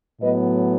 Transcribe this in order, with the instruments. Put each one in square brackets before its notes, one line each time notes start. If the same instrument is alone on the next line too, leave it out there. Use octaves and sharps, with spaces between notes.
[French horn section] A2 F#3 B3 B4 D#5